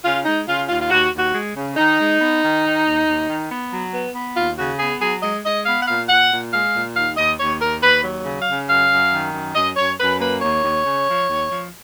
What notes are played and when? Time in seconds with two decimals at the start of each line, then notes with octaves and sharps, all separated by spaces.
0.03 C#3 F4
0.25 G#3 D#4
0.46 C#3 F4
0.68 D#2 F4
0.80 F4
0.89 D#2 F#4
1.11 D#2
1.19 F#4
1.33 G#3
1.55 C#3
1.76 D#3 D#4
1.99 G#3
2.20 B3
2.41 D#3
2.63 D#3
2.85 D#2
3.06 D#2
3.28 D#3
3.50 B3
3.71 F#3
3.93 B3
4.15 B3
4.36 D#2 F4
4.58 C#3 F#4
4.79 B3 G#4
5.01 F#3 G#4
5.22 G#3 D#5
5.44 G#3 D#5
5.65 B3 F5
5.82 F#5
5.87 A#2 F5
6.09 A#2 F#5
6.31 A#2
6.52 G#3 F5
6.74 A#2
6.95 D#2 F5
7.17 D#2 D#5
7.39 D#2 C#5
7.60 D#2 A#4
7.82 D#2 B4
8.04 F#3
8.25 C#3
8.39 F5
8.47 C#3
8.68 F#2 F5
8.90 F#2
9.12 D#3
9.33 F#2
9.55 F#2 D#5
9.76 F#2 C#5
9.99 F#2 B4
10.20 A#3 B4
10.41 D#2 C#5
10.63 D#2
10.85 C#3
11.07 F3
11.29 D#2
11.50 F3